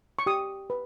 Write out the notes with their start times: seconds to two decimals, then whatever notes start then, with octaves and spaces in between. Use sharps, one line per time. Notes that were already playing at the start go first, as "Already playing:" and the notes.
0.19 C#6
0.26 G4 D#6
0.70 B4